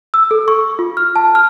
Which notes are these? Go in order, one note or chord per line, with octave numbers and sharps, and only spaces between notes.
E6
A4
C#6
F4
F6
A5
F6